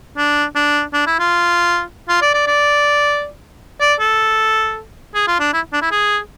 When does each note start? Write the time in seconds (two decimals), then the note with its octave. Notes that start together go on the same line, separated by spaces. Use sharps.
0.18 D4
0.55 D4
0.94 D4
1.07 E4
1.19 F4
2.09 F4
2.22 D5
2.34 D5
2.47 D5
3.80 D5
4.00 A4
5.15 G#4
5.28 F4
5.40 D4
5.53 E4
5.73 D4
5.82 E4
5.91 G#4